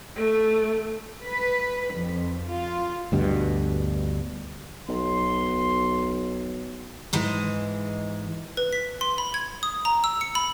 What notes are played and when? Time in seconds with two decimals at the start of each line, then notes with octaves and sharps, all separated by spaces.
0.16 A3
1.23 B4
1.94 F2
2.47 F4
3.12 D2 G2 B2
4.89 B1 C6
7.13 G#2 E3 G#3
8.57 B4
8.73 B6
9.01 C6
9.18 B5
9.34 G#6
9.63 D#6
9.85 A#5
10.04 E6
10.21 C#7
10.35 B5